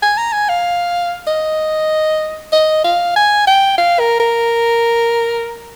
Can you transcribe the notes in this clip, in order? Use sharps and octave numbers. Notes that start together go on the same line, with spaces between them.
G#5
A#5
G#5
F5
D#5
D#5
F5
G#5
G5
F5
A#4
A#4